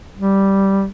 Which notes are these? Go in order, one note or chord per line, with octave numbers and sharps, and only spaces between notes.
G3